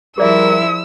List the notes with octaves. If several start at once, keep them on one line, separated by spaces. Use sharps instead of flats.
F3 G3 E4 G#4 A#4 D5 E5 E6